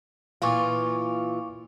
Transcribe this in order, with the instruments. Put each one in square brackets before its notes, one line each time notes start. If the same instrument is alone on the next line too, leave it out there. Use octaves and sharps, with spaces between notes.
[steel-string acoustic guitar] A#2 E3 F4 [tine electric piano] F5 C#6 D6